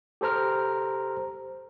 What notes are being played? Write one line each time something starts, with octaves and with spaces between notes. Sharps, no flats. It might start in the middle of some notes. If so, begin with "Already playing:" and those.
G4 A4 C5 A#5 F6